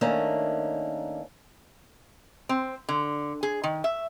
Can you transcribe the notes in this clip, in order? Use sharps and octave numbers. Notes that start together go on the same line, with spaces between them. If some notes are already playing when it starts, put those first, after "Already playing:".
D#3 A3 A#3 C#4 D4
C4
D3
G#4
D#3
E5